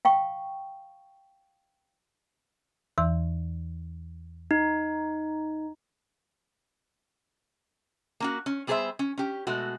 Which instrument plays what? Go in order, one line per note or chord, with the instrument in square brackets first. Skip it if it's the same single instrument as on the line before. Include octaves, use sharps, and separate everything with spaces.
[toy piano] F5 G5 C#6
[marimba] E2 E3 C6
[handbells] D#4
[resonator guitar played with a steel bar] A#3 C#4 F#4
C#4
G3 B3 G#4 A#4 C5 E5
C#4
C#4 G4
B2 G#3 A3 F#4